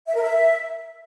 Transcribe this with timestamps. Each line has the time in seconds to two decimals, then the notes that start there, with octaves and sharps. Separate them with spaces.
0.08 E5
0.15 A#4
0.23 E5